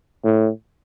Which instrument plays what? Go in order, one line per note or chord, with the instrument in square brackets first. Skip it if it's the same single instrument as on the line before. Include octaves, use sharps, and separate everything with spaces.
[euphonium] A2